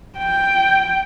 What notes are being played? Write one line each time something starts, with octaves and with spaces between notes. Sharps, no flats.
G5